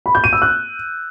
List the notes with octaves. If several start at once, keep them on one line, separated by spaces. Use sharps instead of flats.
B5
G6
D#7
E6
F#6